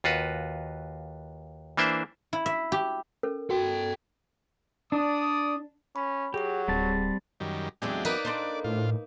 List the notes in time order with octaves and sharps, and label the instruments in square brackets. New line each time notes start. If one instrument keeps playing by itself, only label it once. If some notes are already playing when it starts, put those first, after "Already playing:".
[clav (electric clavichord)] D#2 F4 F#4 B4
E3 A#3 D4 C5 E5
[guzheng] E4
E5
G4
[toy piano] C#4 A4 A#4
[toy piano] F#4 [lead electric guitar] A4 G5
[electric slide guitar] D4 [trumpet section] D5 D6 D#6
[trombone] C#4 [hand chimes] B5
[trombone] F#3 [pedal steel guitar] G4 [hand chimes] G#4 F#5
[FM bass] D1 [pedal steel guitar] G3 C4 A5
[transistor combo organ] F#2 D#3 G3
[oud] E2 F#3 C4 [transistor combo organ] G#3 D4 G4
[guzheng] A#3 D#4 B4 [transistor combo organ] D5
[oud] D4 A4 C5
[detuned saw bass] A2 [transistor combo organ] F4